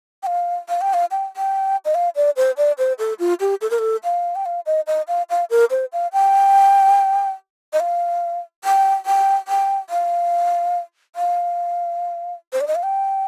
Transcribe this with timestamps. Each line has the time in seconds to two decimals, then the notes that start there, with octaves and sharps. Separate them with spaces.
0.23 G5
0.26 F5
0.69 F5
0.81 G5
0.94 F5
1.11 G5
1.37 G5
1.85 D#5
1.94 F5
2.16 D5
2.36 C5
2.57 D5
2.78 C5
2.99 A4
3.19 F4
3.40 G4
3.61 A4
3.70 A#4
3.79 A4
4.04 F5
4.35 G5
4.45 F5
4.66 D#5
4.87 D#5
5.08 F5
5.30 F5
5.50 A#4
5.70 C5
5.93 F5
6.13 G5
7.73 D#5
7.80 F5
8.64 G5
9.06 G5
9.48 G5
9.90 F5
11.16 F5
12.53 C5
12.61 D5
12.67 D#5
12.75 F5
12.83 G5